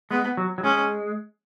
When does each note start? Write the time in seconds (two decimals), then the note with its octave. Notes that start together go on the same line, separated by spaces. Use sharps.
0.11 G#3 B3
0.37 F#3
0.58 F#3
0.63 G#3 C#4